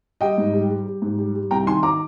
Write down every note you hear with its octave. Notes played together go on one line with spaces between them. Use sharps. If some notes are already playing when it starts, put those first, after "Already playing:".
G3 D#5 G5
G#2
G3
G3
G3
G#2
G3
G3
C2 G5 A#5
D#3 G#5 C6
A#5 D6